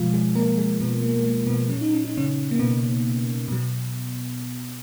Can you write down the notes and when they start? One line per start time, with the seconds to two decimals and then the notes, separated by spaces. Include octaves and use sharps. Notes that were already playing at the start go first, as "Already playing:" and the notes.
Already playing: B2 F3 G#3 F4
0.13 G#3 G#4
0.35 A#3 A#4
0.58 G#3 G#4
0.80 B2 B3
1.02 A#3
1.18 G#3
1.25 A#3
1.47 B2 B3
1.69 A#2 F#3 C#4
1.81 D#4
1.93 C#4
2.05 D#4
2.17 C#3 C#4
2.51 A#3
2.59 B2 B3
3.48 B2 F#3